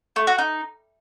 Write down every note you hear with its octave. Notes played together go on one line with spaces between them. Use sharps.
A3
F#4
D#4